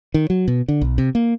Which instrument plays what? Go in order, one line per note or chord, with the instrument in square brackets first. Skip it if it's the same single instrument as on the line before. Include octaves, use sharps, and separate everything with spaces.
[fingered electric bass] D#3
F#3
B2
D3
B1
C3
A#3